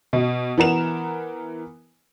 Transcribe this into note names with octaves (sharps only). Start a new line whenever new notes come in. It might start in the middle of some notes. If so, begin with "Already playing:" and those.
B2
E3 B3 A#4 E7 F7